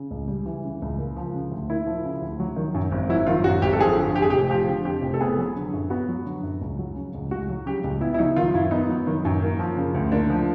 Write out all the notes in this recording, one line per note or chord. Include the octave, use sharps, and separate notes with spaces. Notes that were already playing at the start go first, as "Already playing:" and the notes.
Already playing: C#3
C#2
G3
E3
C#3
C#2
A#3
F3
C#3
D2
A#3 E4
F3
C#3
D2
F#3
D#3
F#2
G#1
F#3 E4
D#3 F4
F#2 F#4
G#1 G4
A4
F3 G#4
D3
F2 G4
G#4
G4
F1
F3 G4
D3
F2 G4
F1
A4
B3 G#4
F#3
D3
F#2
B3 F#4
F#3
D3
F#2
C#2
F#3
C#3
C#2
C#2 F#4
F#3
C#3 G4
C#2
B3 E4
E4
F#3 D#4
D#3 F4
F#2 E4
B3 D#4
F#3
D#3
F#2
A#3
F3
C#3
D2
A#3 D4
F3